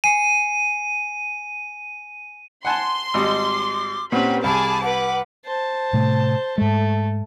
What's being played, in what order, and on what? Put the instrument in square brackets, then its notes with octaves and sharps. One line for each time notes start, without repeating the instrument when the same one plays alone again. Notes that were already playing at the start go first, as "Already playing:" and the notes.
[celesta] G#5 C7 C#7 [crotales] D#7
[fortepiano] F#5 G#5 A5 [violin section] C6
[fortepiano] G#1 G3 D#5 [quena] D6
[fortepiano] A#2 C4 C#4 [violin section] G4 B4 B5 [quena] F#5
[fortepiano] C2 [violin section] G#4 A5 D6 [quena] B5
[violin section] B4 D6 [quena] F#5
[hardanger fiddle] C5 A5
[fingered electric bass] A2 C3 A3
[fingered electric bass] G#2 G#3 [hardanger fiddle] A3